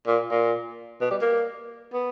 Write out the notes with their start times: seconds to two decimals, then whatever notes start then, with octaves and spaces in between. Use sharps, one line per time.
0.07 A#2
0.31 A#2
1.01 B2
1.11 G3
1.22 A#3
1.94 B3